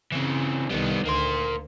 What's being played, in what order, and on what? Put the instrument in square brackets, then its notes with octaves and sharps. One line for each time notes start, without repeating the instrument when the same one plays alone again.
[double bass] C#3 [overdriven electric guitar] E3 C4
[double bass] C2 D#3 [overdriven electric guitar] G3 B3
[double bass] D2 [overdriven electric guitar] A#3 C6